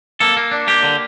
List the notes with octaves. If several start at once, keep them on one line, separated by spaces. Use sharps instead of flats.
A#3 A4
A#3
D4
A#3 G4
D3